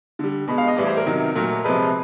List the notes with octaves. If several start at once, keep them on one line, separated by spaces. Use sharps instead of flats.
D3 G3
B2 G#3 B5
F5
D#5
A2 E3 G3 D5
C5
A#4
C3 D#3 F#3
A#2 F#3 A3 A#4
C3 F3 G#3 B4